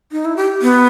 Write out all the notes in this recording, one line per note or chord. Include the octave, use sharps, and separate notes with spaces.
D#4
E4
G4
B3